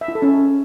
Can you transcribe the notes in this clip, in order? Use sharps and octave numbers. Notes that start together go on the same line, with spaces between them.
E5
E4
A4
C#4